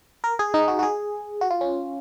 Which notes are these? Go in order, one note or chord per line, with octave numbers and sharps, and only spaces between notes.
A#4
G#4
D#4
F#4
F#4
G#4
F#4
F4
C#4